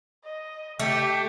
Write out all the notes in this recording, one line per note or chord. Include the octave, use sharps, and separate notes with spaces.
D#5
A3 G4